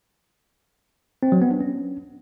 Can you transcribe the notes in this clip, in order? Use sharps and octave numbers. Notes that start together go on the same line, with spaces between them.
C4
F#3
B3
D4
C#4